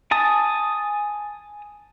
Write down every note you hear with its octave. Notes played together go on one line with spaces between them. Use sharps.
G#5 A5 D#6